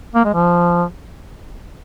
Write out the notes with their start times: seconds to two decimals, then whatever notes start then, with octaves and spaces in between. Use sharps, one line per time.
0.15 A#3
0.25 G#3
0.34 F3